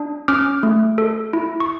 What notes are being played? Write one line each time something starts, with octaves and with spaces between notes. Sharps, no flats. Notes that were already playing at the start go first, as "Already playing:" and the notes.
Already playing: D4
C#4 D6 F6
A3
A4
E4
C#6